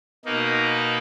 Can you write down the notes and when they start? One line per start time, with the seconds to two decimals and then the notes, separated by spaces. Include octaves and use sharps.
0.25 B2 A#3 D#4